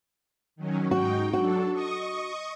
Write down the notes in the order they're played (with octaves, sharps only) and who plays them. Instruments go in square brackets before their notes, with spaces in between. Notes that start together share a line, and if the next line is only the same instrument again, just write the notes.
[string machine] D#3 F#3 C#4
[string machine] G#2 D#4 G5 [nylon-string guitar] F#4
[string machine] F#3 D4 A4 [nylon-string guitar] F#4
[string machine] D#5 C#6 D#6